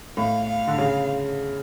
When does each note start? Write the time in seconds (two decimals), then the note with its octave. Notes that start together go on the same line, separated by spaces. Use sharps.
0.17 A2 F5
0.49 F5
0.67 D3
0.78 C#3